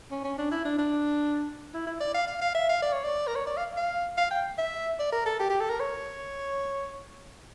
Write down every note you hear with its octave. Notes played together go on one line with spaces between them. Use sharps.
C#4
C#4
D4
E4
D4
D4
E4
E4
D5
F5
F5
F5
E5
F5
D5
C#5
D5
A#4
C#5
D5
F5
F5
F5
G5
E5
D5
A#4
A4
G4
G4
A4
A#4
C#5